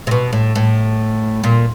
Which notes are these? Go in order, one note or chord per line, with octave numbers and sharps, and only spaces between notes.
C3
B2
A2
A2
A#2